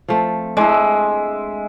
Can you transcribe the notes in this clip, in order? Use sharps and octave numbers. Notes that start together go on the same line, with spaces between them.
F3 A3 C4
G#3 D4 E4 E5